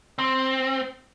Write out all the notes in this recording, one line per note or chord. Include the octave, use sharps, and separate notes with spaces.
C4